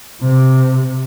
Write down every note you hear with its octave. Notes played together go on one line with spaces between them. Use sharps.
C3